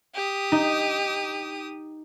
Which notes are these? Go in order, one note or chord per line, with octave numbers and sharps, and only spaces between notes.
G4 D#6
D#4